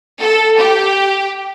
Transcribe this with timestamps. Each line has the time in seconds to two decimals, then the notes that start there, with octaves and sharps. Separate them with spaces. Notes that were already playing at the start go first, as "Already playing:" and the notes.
0.20 A4
0.57 G4